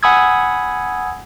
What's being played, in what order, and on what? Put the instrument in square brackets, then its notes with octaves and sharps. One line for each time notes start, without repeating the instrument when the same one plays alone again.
[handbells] F#5 G#5 B5 D#6 E6 G#6